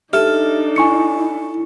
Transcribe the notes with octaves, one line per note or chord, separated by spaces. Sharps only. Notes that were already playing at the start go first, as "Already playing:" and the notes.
D4 D#4 G4 A4 E5 F6
E4 G#5 C#6 C#7